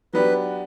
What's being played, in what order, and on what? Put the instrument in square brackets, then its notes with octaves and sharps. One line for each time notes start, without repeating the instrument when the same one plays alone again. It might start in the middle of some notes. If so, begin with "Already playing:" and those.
[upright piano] F#3 B3 D4 G4 [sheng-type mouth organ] B4